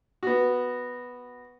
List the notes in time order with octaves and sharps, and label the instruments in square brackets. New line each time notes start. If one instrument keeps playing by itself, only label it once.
[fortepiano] B3 F#4